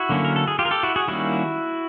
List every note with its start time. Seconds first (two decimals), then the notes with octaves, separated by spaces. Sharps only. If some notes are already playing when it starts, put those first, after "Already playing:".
Already playing: E4 F#4
0.09 D3 F#3 A#3 C#4
0.25 A#4
0.36 A4
0.48 G#4
0.59 F4 G4
0.65 A#4
0.71 G4 A4
0.83 E4 F#4
0.96 F#4 G#4
1.08 D#3 G3 A#3 C#4 E4 F#4